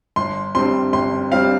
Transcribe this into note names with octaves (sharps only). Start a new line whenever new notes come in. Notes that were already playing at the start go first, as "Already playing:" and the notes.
G1 C6
G2 G3 C4 C6
G1 C6
G3 C4 F5